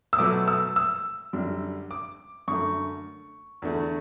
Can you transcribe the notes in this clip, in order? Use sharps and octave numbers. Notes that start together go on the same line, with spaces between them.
E6
B2 F#3 A3 D6
E6
E6
F#2 D3 G3
D6
F#2 D3 A3 C#6
E2 D3 A3